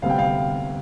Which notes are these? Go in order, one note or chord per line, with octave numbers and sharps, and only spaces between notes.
D2 C3 G3 B3 F5
G5
F5